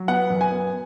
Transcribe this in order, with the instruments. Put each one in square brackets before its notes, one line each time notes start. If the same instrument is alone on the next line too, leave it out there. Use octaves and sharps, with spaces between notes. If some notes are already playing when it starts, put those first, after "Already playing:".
Already playing: [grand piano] F#3
B3 F#5
F#2
G#5
B3